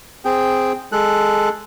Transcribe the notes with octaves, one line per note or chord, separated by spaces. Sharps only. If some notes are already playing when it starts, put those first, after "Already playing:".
C4 G#4 G5
G#3 A4 F#6